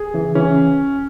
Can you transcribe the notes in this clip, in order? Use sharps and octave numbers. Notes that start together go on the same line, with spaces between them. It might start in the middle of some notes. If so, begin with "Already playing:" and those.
Already playing: G#4
C#3 E3
C#3 E3 C#4